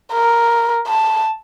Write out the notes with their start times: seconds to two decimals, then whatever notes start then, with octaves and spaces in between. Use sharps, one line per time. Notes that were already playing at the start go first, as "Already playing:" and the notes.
0.13 A#4
0.88 A5